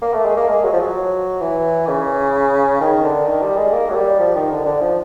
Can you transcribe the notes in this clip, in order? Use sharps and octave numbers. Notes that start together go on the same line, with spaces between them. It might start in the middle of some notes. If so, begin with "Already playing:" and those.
A#3
A3
G#3
A#3
G#3
F#3
F3
F#3
E3
C#3
D#3
D3
D#3
G3
G#3
A#3
F#3
G3
F3
D#3
D3
D3
F3